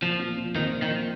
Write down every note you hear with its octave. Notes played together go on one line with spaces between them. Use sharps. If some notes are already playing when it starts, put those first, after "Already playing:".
A#2 F3
F3
A#2
D#3 C4
A#2
D#3
F3